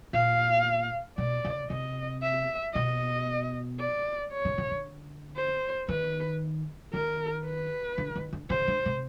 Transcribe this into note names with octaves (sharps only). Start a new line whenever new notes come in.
A#2 F5
B2 D5
C#3
C3 D#5
E5
B2 D#5
D5
C#5
C#3
C#3
D3
C5
D#3 B4
D#3 A#4
B4
D3
D#3
D3
C#3 C5
D3
C3